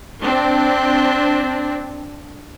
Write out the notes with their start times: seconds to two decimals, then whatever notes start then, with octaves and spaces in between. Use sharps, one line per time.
0.22 C4 D4